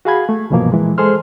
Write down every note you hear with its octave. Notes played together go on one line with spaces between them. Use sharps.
F#4 G#4 F5 G#5 B5 G#6
A3
C2 G2 B2 E3 F3 A#3
A#2 E3 G#3
G#3 G#4 A4 C5 C6 F6